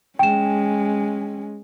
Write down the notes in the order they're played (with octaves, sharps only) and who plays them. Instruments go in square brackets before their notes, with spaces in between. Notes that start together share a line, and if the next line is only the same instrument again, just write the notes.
[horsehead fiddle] G#3 C#4 [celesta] G5 E7